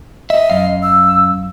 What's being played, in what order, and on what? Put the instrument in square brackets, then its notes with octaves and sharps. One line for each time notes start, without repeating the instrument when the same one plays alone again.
[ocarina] D#5 [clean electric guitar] E5
[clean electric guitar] F#2 F5
[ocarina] E6